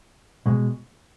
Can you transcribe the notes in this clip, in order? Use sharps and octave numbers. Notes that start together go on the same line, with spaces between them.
B2 G#3